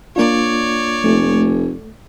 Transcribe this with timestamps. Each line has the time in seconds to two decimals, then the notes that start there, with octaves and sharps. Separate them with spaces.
0.16 A#3 D4 F4 C#5 D5
1.04 F1 A3